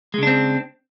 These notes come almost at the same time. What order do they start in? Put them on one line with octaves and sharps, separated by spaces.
G#3 C#3 D4 C4